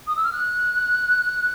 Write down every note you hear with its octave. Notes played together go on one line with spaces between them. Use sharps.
D#6
E6
F6
F#6